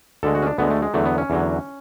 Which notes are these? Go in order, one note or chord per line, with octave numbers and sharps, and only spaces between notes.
D2 D3 G#3 A4
F#4
C#4
D4
D2 D3 G#3 B3
A3
G#3
E2 D3 F#3 A3
B3
C#4
E2 D3 F#3